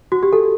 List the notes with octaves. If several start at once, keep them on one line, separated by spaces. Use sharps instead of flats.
F#4
G4
A4